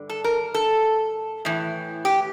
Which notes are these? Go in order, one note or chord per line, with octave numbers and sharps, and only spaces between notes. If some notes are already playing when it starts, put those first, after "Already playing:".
Already playing: G2 D3
A4
A#4
A4
A2 E3
G4